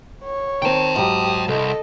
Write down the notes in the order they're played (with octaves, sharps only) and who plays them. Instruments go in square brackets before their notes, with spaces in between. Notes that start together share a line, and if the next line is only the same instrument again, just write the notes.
[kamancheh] C#5
[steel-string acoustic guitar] D#3 C4 [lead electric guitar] G5 A5
[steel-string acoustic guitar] G#2 F#3 [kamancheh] G4 D#6
[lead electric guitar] C2 [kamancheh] A4 D#5